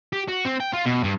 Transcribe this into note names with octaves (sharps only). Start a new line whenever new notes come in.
G4
F#4
C4
G5
F4
B2
G2